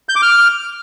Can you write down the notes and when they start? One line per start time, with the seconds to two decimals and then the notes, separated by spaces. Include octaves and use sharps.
0.09 G6
0.16 D6
0.22 F6